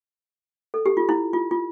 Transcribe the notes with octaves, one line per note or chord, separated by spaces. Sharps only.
A4
G4
F4
E4
F4
F4